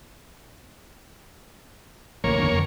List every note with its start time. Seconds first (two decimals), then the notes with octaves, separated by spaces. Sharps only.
2.24 A1 D2 A#3 C#5
2.38 G1 E2 D4
2.52 F2 D3 B3